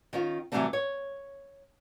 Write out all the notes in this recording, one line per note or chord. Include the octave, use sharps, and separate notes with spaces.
D#3 C#4 F4
C3 E3 F#3 G3 A3 C4
C#5